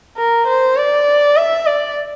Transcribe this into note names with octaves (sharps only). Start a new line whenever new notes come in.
A#4
C5
D5
E5
D5